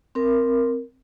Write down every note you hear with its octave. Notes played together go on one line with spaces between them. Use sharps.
C4 A#4